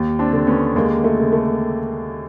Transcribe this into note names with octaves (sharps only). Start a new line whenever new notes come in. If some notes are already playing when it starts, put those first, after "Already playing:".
Already playing: D#2
C4 D4
D3
B3 C#4
D#2 G#3 A#3
A3
C#3
A3